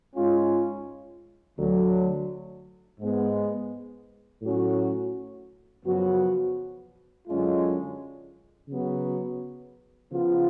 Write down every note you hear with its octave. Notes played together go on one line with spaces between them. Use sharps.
G#2 G#3 C#4 F4
D2 D3 F#3
G#2 G#3 B3
A2 F#3 C#4 F#4
F#2 C#3 F3 B3 F#4
F#2 D3 G#3 C#4 F4
C#3 F#3 B3 F#4
C#3 F3 B3 F4